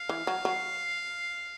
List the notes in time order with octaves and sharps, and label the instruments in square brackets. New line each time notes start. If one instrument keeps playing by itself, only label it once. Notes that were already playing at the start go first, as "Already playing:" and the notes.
Already playing: [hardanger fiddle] F5
[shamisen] E3
F#3
F#3